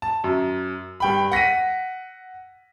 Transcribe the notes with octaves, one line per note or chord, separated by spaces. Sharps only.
A5
F#2
G2 G5 B5
F#5 A#6 B6 D#7